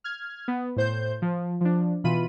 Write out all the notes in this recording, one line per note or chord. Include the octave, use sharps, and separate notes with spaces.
F6 G#6
B3
A2 C5 G6
F3
F3 D4
B2 E3 F4 B5 D#7